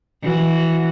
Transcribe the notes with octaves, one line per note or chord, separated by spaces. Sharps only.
E3 F#4